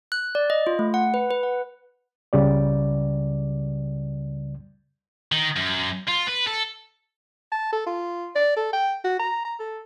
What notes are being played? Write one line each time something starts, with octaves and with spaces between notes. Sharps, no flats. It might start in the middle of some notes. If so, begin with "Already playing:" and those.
F#6
D5
D#5
F4
A3
F#5
B4
B4
F#5
C#2 C#3 G3 D5
D#3
F#2
F4
B4
A4
A5
A4
F4
D5
A4
G5
F#4
A#5
A#5
A4